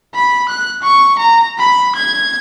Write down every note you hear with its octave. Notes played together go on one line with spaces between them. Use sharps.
B5
F#6
C#6
A#5
B5
G#6